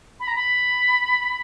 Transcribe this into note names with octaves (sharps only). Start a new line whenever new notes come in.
B5
A#5
B5